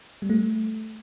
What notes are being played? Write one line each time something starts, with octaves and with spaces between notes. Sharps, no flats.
G3
A3